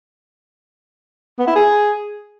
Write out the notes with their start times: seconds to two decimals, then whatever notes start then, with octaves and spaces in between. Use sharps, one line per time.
1.39 B3
1.47 E4
1.56 G#4